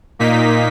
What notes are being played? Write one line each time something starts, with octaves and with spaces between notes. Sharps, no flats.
A#2 A#3 D#4 B6